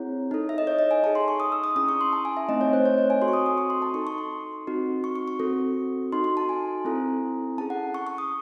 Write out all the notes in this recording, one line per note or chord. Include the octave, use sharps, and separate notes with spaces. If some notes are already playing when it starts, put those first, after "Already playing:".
Already playing: C4 E4 G#4 C#5
D#4 A4
E5
D#5
C#5
D#5
G#5
D#4 G#4 A5
C6
C#6
D#6
E6
D#6
C#4 E4 G#4 D#6
C#6
C6
A5
G#5
E5
A3 C4 D#4 D#5
C#5
C5
C#5
D#5
G#5
C4 F#4 A4 C6
C#6
D#6
D#6
C#6
C6
A5
D#4 A4 C#6
C#6
C6
C4 D#4 F#4
C#6
C#6
C#6
C4 F#4 A4
D#4 F#4 A4 C6
C6
A5
G#5
C4 E4 A4
C#4 G#4 A5
F#5
C#6
C#6
D#6